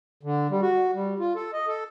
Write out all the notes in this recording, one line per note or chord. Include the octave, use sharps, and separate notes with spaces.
D3
G3
F#4
G3
F4
A4
D#5
A4